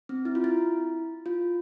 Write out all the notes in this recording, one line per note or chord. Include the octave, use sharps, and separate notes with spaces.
C4
E4
F4
E4
F4